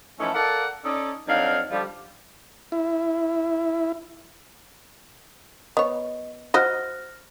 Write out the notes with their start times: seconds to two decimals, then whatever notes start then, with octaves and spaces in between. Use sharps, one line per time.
0.20 E3 F3 A3 C#4 D#4 E4
0.34 A4 A#4 D5 F5 F#5
0.84 C#4 D#4 A4 D5
1.28 F2 F#3 D4 D#4 F5
1.71 D3 F3 G3
2.72 E4
5.77 B3 C#5 D#5
6.54 F#4 C5 D#5 F6 F#6 A#6